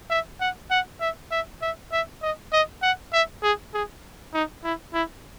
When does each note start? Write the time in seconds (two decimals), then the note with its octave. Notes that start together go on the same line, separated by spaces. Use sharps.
0.10 E5
0.41 F#5
0.71 F#5
1.00 E5
1.31 E5
1.62 E5
1.92 E5
2.22 D#5
2.53 D#5
2.83 F#5
3.13 E5
3.43 G#4
3.74 G#4
4.34 D#4
4.64 E4
4.94 E4